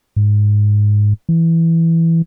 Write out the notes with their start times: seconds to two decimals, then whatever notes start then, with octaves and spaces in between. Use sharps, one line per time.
0.16 G#2
1.29 E3